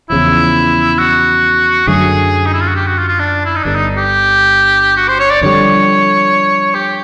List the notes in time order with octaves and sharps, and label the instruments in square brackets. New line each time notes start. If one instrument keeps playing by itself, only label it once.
[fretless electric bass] E2 C#3 F3 [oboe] E4
[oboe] F#4
[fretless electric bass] F#2 D3 F#3 A3 [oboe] G#4
[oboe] D#4
E4
F4
F#4
G4
F#4
F4
F4
D4
E4
D#4
[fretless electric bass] G1 G2 D3 [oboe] D4
[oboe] D#4
G4
F#4
C5
C#5
D5
[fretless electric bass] F2 D3 G3 [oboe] C#5
[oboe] G4